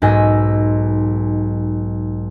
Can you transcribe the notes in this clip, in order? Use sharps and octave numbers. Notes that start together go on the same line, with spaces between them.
B1 G#2 D#5 G#5 E6